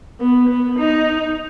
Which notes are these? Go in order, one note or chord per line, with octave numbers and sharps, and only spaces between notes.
B3
B3
D#4